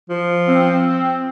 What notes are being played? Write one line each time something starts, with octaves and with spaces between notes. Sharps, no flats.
F3
C4